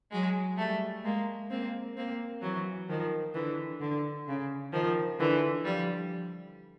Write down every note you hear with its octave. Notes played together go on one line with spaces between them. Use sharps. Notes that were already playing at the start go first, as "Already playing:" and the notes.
F#3 G#3
G3 A3
G#3 A#3
A#3 C4
A#3 C4
E3 F#3
D#3 F3
D3 E3
D3
C#3
D#3 F3
D3 E3
F3 G3